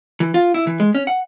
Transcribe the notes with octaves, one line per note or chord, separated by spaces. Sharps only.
E3
F4
E4
E3
G#3
C#4
F#5